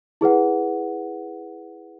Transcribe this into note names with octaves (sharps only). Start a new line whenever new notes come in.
E4 G#4 B4 F#5